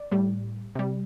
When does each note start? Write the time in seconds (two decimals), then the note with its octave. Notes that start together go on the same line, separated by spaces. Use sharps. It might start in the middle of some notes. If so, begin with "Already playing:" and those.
Already playing: D5
0.11 A2 G3
0.75 C3 G3